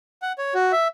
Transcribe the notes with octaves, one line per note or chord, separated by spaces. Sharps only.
F#5
C#5
F#4
E5